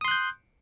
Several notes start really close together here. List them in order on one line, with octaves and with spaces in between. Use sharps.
D#6 C6 F#6 G6